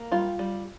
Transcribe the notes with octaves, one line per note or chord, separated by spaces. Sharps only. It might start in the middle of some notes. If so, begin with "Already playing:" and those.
Already playing: A#3
G3 F4
G3